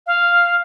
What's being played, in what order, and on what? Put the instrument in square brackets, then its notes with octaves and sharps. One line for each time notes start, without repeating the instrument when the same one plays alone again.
[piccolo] F5